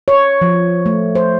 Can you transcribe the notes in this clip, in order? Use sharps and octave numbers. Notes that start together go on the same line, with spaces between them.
C#5
F3
A3
C5